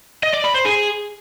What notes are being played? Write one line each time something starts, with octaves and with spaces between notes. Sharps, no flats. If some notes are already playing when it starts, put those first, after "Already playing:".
D#5
D5
B5
C5
G#4